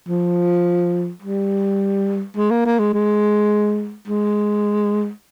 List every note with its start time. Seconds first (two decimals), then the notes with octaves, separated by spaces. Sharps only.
0.08 F3
1.22 G3
2.37 G#3
2.51 A#3
2.66 A#3
2.79 G#3
2.94 G#3
4.08 G#3